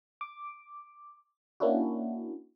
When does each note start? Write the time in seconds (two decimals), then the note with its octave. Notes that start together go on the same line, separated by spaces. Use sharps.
0.21 D6
1.60 A#3 C#4 D4 E4 F#4